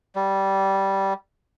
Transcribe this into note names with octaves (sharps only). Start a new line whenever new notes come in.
G3